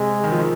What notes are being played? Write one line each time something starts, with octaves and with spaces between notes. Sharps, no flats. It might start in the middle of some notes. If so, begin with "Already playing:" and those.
Already playing: C3 G#3
D#3
F3
D#3